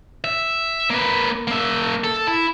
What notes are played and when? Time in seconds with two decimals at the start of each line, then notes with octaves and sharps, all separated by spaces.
0.24 E5
0.90 A#3 B4
1.48 A#3 E5
2.04 A4
2.27 E4